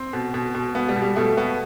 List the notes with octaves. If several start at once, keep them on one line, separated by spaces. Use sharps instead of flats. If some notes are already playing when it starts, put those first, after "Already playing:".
Already playing: C4
B2
B2
B2
B2 B3
G3
B2
G3
B2 A3
B2 B3